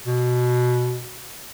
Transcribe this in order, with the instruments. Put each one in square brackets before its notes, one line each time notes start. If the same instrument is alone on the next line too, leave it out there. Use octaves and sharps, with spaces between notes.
[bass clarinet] B2